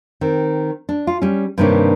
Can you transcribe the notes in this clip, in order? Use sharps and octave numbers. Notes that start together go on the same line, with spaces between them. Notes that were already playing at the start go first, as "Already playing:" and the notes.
D#3 C4
D4
F4
G3 C#4
G2 C3 D#3 A#3 D4 C#5